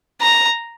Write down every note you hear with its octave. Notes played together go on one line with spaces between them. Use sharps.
A#5